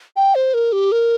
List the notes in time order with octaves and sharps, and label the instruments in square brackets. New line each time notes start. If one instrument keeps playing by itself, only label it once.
[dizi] G5
C5
A#4
G4
A#4